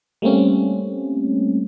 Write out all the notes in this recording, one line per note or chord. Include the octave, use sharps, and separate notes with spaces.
G3 A3 A#3 C4 C#4